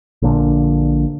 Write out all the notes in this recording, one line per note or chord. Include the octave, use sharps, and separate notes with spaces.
A#1 A#2 D3